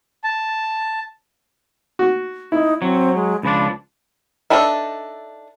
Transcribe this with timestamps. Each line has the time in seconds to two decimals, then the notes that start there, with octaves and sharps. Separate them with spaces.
0.24 A5
1.99 F#4
2.52 D#4 E4
2.82 F#3 C4
3.15 G#3
3.43 C#2 F3 D4 B5
4.50 D4 D#4 A4 B4 E5